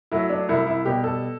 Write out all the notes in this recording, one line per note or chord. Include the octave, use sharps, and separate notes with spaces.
F#3 A3 E4
D4
C2 E4
E4
B2 G3 G4
A4